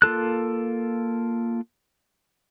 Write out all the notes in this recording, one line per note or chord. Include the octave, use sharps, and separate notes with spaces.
A#3 F4 A4 F#6